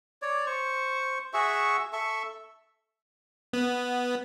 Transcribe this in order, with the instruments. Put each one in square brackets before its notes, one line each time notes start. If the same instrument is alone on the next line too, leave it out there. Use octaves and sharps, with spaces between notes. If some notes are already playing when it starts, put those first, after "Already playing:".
[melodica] C#5 D5
C5 C#6
F#4 G#4 E5 C#6
A4 E5 C#6
[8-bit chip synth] B3